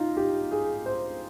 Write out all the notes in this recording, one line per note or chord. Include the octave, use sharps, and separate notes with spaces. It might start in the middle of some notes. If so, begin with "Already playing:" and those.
Already playing: D#4 F4
G4
G#4
C5